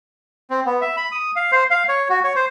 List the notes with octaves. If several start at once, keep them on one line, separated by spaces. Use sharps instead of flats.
C4
B3
E5
B5
D#6
F5
C5
F5
C#5
F#4
C#5
C5